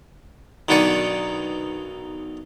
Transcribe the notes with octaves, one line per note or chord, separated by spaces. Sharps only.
B1 D#3 B3 D4 G#5 C#6